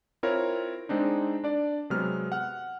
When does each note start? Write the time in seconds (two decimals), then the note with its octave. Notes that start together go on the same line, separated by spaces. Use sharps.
0.23 C4 E4 F4 A#4 C#5
0.89 G#3 C4 D4 D#4
1.44 D4 D5
1.90 C3 F#3 G#3 B3 F6
2.32 F#5 F6